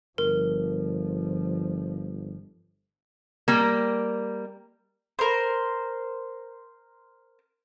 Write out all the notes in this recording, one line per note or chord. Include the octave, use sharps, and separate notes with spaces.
G1 F3 A#4
G3 A#3
A#4 C5